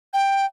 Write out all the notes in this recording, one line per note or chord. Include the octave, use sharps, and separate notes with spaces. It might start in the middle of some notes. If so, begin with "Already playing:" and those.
G5